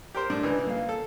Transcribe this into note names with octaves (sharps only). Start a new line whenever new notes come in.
G4 A#4 C5
A2 D4
C#2 E3
A#3 F5
A4